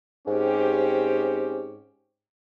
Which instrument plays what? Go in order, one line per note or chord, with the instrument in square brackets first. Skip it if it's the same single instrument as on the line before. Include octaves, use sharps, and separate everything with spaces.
[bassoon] G#2 [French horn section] C4 C#4 G4